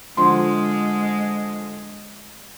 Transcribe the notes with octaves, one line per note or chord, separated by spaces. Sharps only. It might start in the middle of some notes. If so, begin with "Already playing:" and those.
D3 F3 G#3 F4 C6